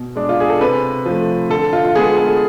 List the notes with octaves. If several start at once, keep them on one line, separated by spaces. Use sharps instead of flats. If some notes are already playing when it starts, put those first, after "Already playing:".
Already playing: B2
G#3 D4
F4
G#4
A4
C3 B4
F3 A3
D3 A4
F4
F4
G#3 B3 F4 G#4
A4